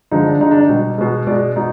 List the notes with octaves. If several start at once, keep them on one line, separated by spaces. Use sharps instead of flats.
D3 F3 G#3 D#4
D4
D3 G#3 D#4
D4
D#4
B2 G3
B2 G#3
B2 G#3 D5
B2 D#4